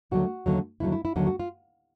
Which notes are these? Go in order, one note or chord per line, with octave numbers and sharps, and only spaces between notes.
D#2 D3 F#3 A3 F#4
D#2 D3 F#3 A3
D#2 D3 F#3 A3 E4
E4
E4
D#2 D3 F#3 A3 F#4
F#4
F4